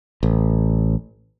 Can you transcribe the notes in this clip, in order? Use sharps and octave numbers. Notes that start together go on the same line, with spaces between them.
A1